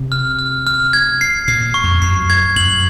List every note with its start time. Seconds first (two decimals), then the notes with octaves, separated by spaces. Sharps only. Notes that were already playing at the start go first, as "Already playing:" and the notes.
Already playing: C3
0.12 F6
0.39 F6
0.67 F6
0.93 G#6
1.21 C7
1.48 A#2 C7
1.74 C#6
1.84 F2
2.02 F#2 C7
2.30 G#6
2.56 F#2 F#7